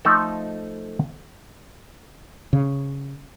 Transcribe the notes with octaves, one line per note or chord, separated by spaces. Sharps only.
F3 A3 D#4 A4
C#3